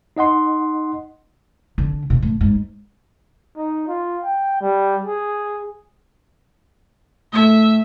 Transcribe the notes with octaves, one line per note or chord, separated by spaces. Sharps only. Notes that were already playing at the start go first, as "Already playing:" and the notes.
D#4 D#5 F#5 C6
D3
B2
A2
G#2
D#4
F4
G5
G3
G#4
A2 A3 E5